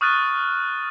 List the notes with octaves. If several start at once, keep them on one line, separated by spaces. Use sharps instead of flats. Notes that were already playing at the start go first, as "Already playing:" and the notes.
C#6 D#6 F6 F#6 A6 D#7